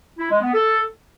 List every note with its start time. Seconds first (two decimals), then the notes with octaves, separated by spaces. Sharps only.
0.18 E4
0.30 G#3
0.42 B3
0.53 A4